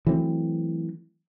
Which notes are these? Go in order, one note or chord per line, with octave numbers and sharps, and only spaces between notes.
E3 F#3 A3 C4